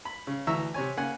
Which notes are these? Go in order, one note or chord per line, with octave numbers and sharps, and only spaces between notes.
B5
C#3
D2 E3 E5 A#5 C#6 E6
C3 C#5 G#5
C#3 A#3 F#5 G#5